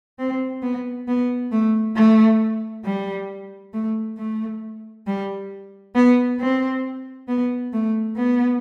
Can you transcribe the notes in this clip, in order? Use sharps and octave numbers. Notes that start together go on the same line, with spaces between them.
C4
B3
B3
A3
A3
G3
A3
A3
G3
B3
C4
B3
A3
B3